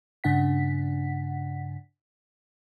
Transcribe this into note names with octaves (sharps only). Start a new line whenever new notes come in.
G2 C#3 D4 F#5 B6